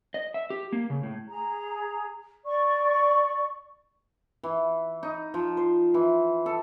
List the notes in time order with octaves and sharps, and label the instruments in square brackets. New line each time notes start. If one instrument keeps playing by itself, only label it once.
[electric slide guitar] D#5
E5
G4
A#3
C#3
A2
[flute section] G#4 A#5
D5 C#6
[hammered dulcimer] E3
D#4
F3
C5
E3
A4